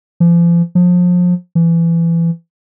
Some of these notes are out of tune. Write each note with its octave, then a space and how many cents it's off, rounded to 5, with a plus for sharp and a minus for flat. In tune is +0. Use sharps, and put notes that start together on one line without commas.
F3 -40
F3 +30
E3 +25